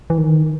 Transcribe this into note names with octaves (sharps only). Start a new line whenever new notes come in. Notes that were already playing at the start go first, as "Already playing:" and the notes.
E3
D#3